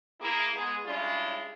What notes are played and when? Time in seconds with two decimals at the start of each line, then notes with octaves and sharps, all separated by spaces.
0.21 A#3 E4 G#4
0.54 G#3 B3 G#4
0.85 G3 G#3 C#4 D4 E4 F4